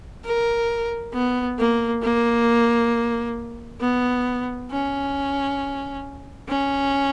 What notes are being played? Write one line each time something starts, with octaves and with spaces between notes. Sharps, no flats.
A#4
B3
A#3
A#3
B3
C#4
C#4